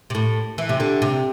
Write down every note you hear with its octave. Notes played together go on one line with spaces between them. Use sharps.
C3
A2
E3
C3
D3
C3